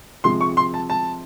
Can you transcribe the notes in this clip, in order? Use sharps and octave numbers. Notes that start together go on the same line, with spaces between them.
C3 F3 G#3 C6
C#6
C6
A5
A5